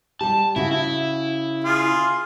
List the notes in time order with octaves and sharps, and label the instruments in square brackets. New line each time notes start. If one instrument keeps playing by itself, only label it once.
[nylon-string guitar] G3 G4 [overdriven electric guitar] A5
[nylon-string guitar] C#3 F#4 [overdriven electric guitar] E4
[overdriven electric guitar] E4
[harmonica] F4 G#4 C6